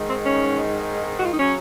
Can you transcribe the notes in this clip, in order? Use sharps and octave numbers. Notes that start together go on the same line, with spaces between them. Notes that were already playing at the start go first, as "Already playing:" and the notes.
Already playing: G#2 D#3 G#3
C4
C#4
F#4
F4
D#4
C#3 F#3 C#4